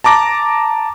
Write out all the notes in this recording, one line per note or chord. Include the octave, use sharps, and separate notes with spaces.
A5 A#5 D6 A#6